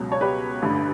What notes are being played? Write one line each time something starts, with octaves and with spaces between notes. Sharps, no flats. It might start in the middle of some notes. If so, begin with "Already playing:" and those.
Already playing: C#2 B2 F#3
C#5
G4 B4
A1 G2 D3 G3